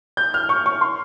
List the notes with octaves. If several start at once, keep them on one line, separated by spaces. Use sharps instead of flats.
G6
F6
C#6
C#6
C6